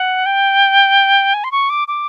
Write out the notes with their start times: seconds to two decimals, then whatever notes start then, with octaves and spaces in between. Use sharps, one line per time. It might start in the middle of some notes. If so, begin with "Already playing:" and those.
Already playing: F#5
0.26 G5
1.34 G#5
1.44 C6
1.52 C#6
1.70 D6
1.88 D6